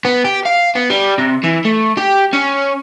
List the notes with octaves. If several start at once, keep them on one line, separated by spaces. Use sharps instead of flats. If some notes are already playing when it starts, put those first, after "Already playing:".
B3
G4
F5
B3
G3
C3
E3
A3
G4
C#4